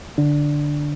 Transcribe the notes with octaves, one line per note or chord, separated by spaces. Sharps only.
D3 D4